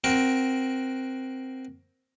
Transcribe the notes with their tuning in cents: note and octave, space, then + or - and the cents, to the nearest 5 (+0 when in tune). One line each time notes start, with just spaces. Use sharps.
C4 +0 F#4 +0 A#4 +10